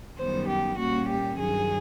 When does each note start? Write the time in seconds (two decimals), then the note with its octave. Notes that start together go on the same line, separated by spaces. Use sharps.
0.18 F#2 D#3 G3 B3 C5
0.49 G4
0.79 A#2 G3 A#3 C#4 F#4
1.09 G4
1.40 G2 D#3 F#3 G#4